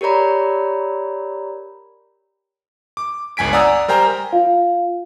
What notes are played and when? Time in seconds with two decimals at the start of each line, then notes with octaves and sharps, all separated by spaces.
0.01 G4 A#4 C#5 D5 A#5 B5
2.97 D6
3.37 G1 C#2 G#5 B6 D7
3.53 D5 F#5 G#5 A#5 D#6 E6
3.88 G3 A#4 C5 G5 G#5 A#5
4.32 F4 F5